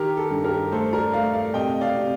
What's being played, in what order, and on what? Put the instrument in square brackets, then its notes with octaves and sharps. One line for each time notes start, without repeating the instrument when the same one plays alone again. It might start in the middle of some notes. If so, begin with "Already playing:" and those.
Already playing: [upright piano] D#3 G4 A#4
A4
G2
G4 A#4
A3 A4 C5
A#4 D5
A3 D5 F5
D5 F5
C3 D#5 G5
D5 F5
C3